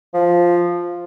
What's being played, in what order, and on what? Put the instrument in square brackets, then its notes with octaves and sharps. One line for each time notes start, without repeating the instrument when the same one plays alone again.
[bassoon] F3